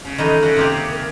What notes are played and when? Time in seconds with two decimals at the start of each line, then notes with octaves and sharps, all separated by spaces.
0.05 C#3
0.18 D#3 E3 D#4 A4
0.43 C#3 F#4
0.57 C3 A#3 G4
0.91 A#4